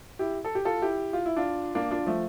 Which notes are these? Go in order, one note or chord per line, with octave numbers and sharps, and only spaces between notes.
E4 G4
A4
G4
F4 A4
E4 G4
F4
E4
D4 F4
A#3 D4
D4 F4
F3 A3